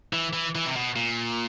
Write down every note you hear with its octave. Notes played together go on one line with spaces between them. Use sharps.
E3
E3
E3
C3
B2
A#2